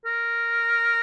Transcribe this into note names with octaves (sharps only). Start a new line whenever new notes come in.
A#4